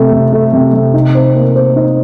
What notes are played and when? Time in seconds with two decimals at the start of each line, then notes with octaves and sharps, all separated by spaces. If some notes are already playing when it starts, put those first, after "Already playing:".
Already playing: C3 A3
0.12 C3
0.32 A3
0.53 C3
0.73 C3
0.94 D#4
1.15 C5
1.35 A#3
1.56 C5
1.76 D#4